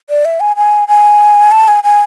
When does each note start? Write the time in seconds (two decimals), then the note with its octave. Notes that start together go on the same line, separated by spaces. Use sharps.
0.10 D5
0.25 E5
0.40 G#5
0.56 G#5
0.88 G#5
1.51 A5
1.68 G#5
1.84 G#5